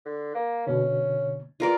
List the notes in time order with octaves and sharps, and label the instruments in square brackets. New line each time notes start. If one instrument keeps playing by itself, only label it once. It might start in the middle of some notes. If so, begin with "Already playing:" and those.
[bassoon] D3
A#3
[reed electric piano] B2 D3 [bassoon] C#4
[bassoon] E2 [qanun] F4 A#4 D5